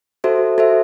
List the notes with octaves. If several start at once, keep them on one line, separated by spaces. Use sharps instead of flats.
F#4 A4 C5 E5
F#4 A4 C5 E5